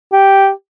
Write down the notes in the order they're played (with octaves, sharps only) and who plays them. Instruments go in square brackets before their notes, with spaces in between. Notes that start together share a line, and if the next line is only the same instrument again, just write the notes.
[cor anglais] G4